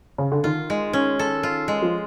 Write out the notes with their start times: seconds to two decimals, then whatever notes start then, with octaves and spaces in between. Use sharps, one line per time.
0.18 C#3
0.32 D3
0.44 D#3 F4
0.70 G#3
0.93 C#4
1.19 A4
1.43 F4
1.68 G#3
1.82 F3